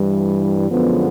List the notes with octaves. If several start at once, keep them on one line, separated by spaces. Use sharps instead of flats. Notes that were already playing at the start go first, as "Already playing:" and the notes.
Already playing: G2 E3 G3
F#2 D3 F3 G#3 B3